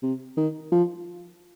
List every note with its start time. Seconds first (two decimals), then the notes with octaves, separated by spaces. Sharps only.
0.03 C3
0.37 D#3
0.72 F3